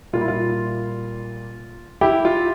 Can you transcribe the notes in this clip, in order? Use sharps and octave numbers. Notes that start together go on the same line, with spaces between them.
A#2 G3 A#3 F4
E4
F4
E4 G4
F4